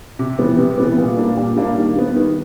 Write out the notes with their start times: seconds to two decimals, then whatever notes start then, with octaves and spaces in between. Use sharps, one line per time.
0.19 C3
0.39 E3 G3 B3
0.58 C3
0.78 E3 G3 B3
0.97 A#2
1.17 G3 A#3 D4
1.37 A#2
1.57 G3 A#3 D4
1.76 D#3
1.96 G3 B3
2.15 D#3